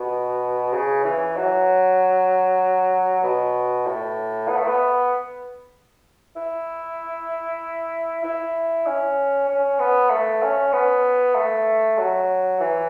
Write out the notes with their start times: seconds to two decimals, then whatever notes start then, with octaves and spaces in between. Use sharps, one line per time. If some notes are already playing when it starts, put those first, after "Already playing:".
Already playing: B2
0.73 C#3
1.05 E3
1.36 F#3
3.23 B2
3.87 A2
4.48 B3
4.57 A3
4.67 B3
6.36 E4
8.24 E4
8.86 C#4
9.48 C#4
9.79 B3
10.11 A3
10.42 C#4
10.73 B3
11.35 A3
11.98 F#3
12.60 E3